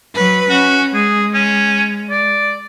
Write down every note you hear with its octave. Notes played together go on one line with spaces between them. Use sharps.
F#3 B4
C#4 F#4
G#3 G#4
C#4
D5